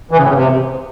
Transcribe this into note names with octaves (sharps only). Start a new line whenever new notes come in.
E3
C#3
A2
C#3
C3